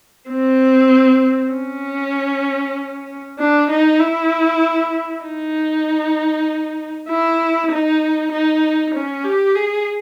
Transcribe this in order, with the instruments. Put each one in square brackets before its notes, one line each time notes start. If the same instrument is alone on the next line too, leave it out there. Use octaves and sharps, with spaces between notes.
[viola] C4
C#4
D4
D#4
E4
D#4
E4
D#4
D#4
C#4
G4
G#4